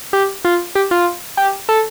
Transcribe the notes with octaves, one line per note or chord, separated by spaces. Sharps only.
G4
F4
G4
F4
G4
A4